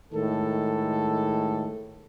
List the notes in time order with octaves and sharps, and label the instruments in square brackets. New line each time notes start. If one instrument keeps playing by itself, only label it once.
[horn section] A2 D#3 G#3 A4